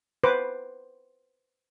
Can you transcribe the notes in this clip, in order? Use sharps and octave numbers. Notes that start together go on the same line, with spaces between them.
B4 C5 D6